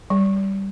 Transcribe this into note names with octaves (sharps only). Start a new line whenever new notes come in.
G3